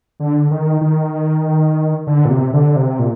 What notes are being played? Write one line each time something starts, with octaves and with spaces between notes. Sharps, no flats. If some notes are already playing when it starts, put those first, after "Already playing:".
D3
D#3
D#3
D3
A#2
C3
D3
C3
A#2